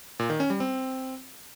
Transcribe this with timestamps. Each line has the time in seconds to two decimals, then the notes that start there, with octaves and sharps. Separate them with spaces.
0.19 A#2
0.30 D#3
0.40 C#4
0.50 G3
0.60 C4